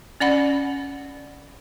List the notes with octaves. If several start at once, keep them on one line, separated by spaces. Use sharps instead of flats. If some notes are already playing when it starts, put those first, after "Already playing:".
C#4 D5 F#5 B5